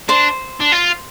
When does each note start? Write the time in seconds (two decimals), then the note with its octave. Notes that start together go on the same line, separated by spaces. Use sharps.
0.08 D4 C5
0.60 D4
0.72 F4